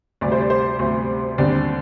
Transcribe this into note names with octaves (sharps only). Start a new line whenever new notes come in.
D2 C3 G3 D5
C5
D5
C5
D2 C3 G3
D#2 D3 G3 C4 D5